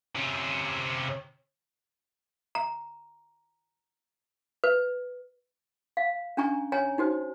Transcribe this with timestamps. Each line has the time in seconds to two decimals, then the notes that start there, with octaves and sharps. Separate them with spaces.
0.15 C3 C#4
2.55 A#5
4.64 B4
5.97 F5
6.37 C#4 D4 G#5 A#5 C#6
6.72 C#5 G#5 A#5
6.98 D#4 F#4 C5